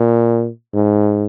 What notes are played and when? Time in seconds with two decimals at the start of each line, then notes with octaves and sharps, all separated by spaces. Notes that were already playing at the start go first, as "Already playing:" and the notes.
Already playing: A#2
0.74 G#2